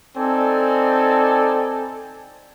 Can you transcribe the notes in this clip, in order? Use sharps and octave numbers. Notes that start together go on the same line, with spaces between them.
C4 D#4 A4 D5 G#5